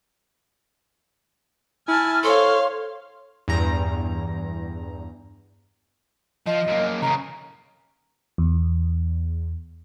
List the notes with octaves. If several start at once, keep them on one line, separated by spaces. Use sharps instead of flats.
E4 G#5 A5 F6
A4 C5 C#5 F5 C6 C#6
E2 G2 A#5
F3 D#5
F#2 A#3
C#3 E3 A#5
E2